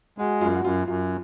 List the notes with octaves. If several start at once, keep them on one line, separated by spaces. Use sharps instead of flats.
G#3 F#4
F#2 F4
F#4
F#2 F4
F#2 F4